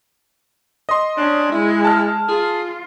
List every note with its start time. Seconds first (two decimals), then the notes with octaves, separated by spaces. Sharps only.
0.89 D#5 C6
1.17 C#4 D4
1.52 G#3 E4
1.85 A5 F6
2.28 F4 G#4